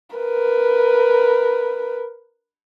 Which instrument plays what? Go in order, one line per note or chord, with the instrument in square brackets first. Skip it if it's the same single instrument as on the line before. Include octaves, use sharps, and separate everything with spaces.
[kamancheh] A#4 B4